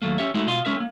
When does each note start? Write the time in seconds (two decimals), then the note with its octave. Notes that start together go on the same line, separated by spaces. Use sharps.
0.02 D#2 G#2 F#3 A3 A#3
0.18 C#4 G4 C#5 E5
0.34 G#3 A3 D#4 E4 F#4
0.47 B2 F4 D#5 F5 C6
0.65 G#3 C#4 A#4 E5
0.77 A#3 C4